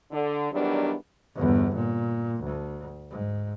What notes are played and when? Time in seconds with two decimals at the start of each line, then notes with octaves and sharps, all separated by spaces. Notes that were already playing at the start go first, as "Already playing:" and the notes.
0.11 D3
0.52 E2 D#3 F#3 G3 B3 D4
1.36 G1 E2
1.75 A#2
2.43 D2
3.10 G#2